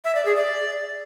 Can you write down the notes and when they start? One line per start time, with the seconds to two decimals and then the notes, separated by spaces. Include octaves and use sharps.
0.05 E5
0.15 D5
0.25 G#4
0.36 D5